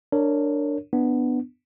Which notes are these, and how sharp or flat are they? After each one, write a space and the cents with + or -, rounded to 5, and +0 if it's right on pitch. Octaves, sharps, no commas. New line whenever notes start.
D4 +0 A#4 -20 C#5 +0
B3 +0 D4 +10